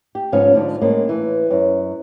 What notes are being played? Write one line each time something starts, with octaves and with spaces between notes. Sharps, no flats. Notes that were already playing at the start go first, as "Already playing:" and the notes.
G4
G#2 C#3 F3 B3 C#4 F5
G#2 D3 F3
A2 G#3 A#3 C#4
E3
F#2